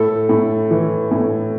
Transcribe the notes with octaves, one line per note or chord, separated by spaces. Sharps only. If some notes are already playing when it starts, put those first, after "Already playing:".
Already playing: A2 A4
A2
E3
A2